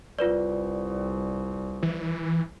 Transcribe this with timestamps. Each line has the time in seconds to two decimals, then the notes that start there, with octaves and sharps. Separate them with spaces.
0.19 C2 F4 B4 D5
1.83 E3